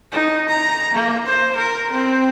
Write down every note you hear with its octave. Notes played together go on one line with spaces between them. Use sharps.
D#4
A#5
A#3
C5
A#4
C4